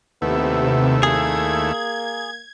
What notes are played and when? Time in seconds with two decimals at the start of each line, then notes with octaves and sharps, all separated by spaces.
0.22 D#2 C3 A3 B3 E4
1.03 A#3 G#4 G#6